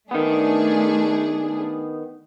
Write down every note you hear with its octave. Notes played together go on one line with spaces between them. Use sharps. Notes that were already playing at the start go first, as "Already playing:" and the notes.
D#3 A3 B3 D4 G#4